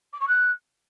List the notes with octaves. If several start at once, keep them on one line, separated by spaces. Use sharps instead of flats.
D6
C#6
F#6